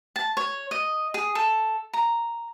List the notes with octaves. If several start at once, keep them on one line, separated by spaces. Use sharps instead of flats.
A5
C#5
D#5
G#4
A4
A#5